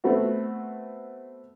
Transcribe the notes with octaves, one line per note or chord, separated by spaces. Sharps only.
A3 B3 C4 F#4